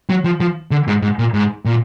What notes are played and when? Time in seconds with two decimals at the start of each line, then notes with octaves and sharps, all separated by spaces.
0.10 F#3
0.25 F3
0.40 F3
0.71 D3
0.88 G#2
1.02 G#2
1.19 A#2
1.34 G#2
1.65 A#2